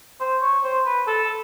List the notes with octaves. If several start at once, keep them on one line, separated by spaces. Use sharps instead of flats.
C5
C#5
C5
B4
A4